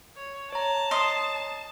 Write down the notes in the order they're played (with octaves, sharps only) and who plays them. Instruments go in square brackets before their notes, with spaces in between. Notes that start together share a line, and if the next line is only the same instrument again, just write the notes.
[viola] C#5
[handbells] C#5 A#5 [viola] A5
[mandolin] D#5 C6